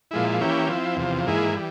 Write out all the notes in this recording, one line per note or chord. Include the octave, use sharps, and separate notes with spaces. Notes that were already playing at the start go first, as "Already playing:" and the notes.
A#2 F3 G#3 E4
E3 A#3 C#4 E4 G4
F3 C4 E4
E2 C3 F3
G#2 E3 A#3 E4 G#4
E3 G3